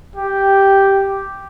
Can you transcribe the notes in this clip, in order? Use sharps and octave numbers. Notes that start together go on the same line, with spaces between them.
G4